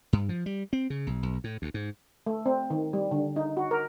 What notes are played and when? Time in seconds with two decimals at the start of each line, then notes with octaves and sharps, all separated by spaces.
0.13 G2
0.29 F3
0.46 G3
0.73 C4
0.90 C#3
1.07 B1
1.23 B1
1.44 A2
1.62 D2
1.74 G#2
2.26 A3
2.46 C4
2.70 D#3
2.93 G3
3.11 D3
3.36 D#4
3.57 F#4
3.71 A#4